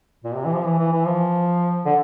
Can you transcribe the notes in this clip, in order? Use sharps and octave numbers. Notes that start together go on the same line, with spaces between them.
A#2
C3
E3
F3
E3
E3
E3
F3
D3